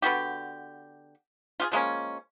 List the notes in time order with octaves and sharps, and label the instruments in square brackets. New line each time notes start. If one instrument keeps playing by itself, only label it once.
[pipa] D3 B3 F#4 G4
F4 G4 G#4
F3 G#3 A#3 C#4